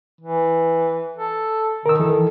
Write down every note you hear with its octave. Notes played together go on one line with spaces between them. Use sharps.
E3
A4
D#3 A#4 E6
E3 A4